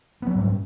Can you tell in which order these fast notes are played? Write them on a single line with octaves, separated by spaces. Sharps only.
B3 F#3 G3 G#2